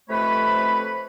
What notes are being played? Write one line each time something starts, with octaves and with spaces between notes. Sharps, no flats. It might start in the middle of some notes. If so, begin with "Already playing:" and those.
F2 C3 A3 B4 C#5 B5